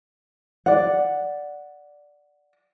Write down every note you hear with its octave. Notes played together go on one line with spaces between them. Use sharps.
D5 F#5